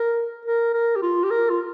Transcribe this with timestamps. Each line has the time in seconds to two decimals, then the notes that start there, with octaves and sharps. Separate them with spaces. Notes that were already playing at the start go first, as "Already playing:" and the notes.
Already playing: A#4
0.46 A#4
0.74 A#4
0.96 G4
1.02 F4
1.23 G4
1.31 A#4
1.50 F4